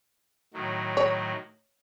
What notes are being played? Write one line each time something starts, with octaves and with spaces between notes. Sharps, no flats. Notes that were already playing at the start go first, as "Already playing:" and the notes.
A2 D#3 F#3
C#5